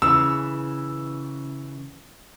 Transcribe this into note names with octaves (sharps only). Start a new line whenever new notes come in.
C#3 E3 E6